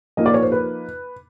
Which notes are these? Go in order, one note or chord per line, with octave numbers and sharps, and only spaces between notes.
F3 A#3 D#4 D#5
D5
C#5
C5
B4